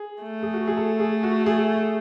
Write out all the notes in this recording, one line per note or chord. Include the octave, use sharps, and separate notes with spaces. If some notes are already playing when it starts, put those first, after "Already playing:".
Already playing: G#4
A3
G#4
F#4
G#4
A4
G#4
F#4
G#4